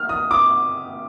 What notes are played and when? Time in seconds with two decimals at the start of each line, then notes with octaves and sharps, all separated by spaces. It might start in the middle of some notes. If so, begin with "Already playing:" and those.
Already playing: F6
0.09 D#6
0.31 D6